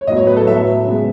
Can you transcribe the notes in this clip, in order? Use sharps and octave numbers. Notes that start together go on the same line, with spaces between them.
C#5
A2 F#3 B3 D#5
C#5
B4
A4
A2 F#3 B3 E5
C#3 G#3 B3